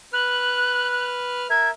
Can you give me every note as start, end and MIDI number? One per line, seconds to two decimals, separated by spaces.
0.13 1.47 71
0.13 1.47 89
0.13 1.06 90
1.50 1.71 70
1.50 1.71 76
1.50 1.68 92